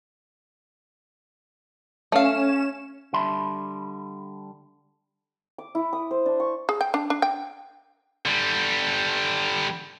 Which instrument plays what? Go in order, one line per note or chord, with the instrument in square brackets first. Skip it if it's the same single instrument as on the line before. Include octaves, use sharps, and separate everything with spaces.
[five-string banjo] A3 F5 [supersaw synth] C#4 E7
[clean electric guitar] D3 G3 E5 A5 B5 C6
[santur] D6
E4
D#6
C5
D4
C#6
[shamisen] G#4
G5
D4
D4
G5
[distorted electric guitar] D3 G3